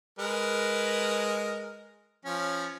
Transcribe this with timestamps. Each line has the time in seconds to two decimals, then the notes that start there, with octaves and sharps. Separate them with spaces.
0.19 G#3 A#4 B4
2.25 F3 C#4